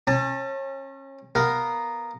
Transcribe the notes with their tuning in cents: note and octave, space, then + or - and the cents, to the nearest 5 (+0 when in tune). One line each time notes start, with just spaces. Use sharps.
C#4 -30 A5 +15
B3 +0 A#4 +0 F5 +0